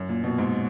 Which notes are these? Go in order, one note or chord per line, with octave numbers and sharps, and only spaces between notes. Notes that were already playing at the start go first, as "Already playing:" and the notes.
Already playing: F#2
A#2
B2
G#2